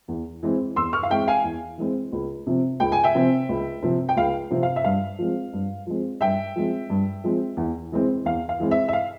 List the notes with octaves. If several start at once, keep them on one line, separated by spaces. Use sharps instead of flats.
E2
E3 G#3 C4
E2 C6 E6
C#6 F6
F5
E3 G#3 C4 E5 G5
F5 G#5
E2
E3 G#3 C4
C#2
C3 F3 C4
C#2 G5
G#5
E5 G5
C3 F3 C4
C#2
C3 F3 C4
G5
C#2 F5
C3 F3 C4
F5
E5
G2 F5
F3 G#3 C4
G2
F3 G#3 C4
G2 E5 G5
F3 G#3 C4
G2
F3 G#3 C4
E2
E3 G#3 C4
E2 F5
F5
E3 G#3 C4
E5
E5
F5